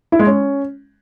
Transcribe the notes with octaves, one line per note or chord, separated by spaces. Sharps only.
E4
G#3
C#4